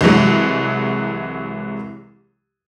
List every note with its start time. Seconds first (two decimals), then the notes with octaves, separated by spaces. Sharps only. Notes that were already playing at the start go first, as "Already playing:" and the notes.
0.01 C2 E3 F#3 G#3